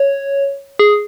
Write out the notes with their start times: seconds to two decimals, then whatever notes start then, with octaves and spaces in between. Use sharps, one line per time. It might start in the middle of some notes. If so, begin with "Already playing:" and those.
Already playing: C#5
0.79 G#4